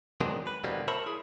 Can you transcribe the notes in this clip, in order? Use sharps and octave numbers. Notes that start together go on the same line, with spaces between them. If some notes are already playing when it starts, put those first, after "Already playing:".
D#3 F#3 G#3 B3 C4 D4
B4
E2 B2 D3 G3 A#3 C4
A#4 C5 C#5 E5 A5 B5
E4 G#4